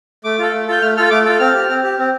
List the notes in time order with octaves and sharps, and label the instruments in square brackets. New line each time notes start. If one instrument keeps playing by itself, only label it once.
[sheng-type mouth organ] A3 D6
F4 A4
A3
F4 A4 G6
A3 F6
F4 A4 F6
A3 D6
F4 A4
C4 F6
G4
C4
G4
C4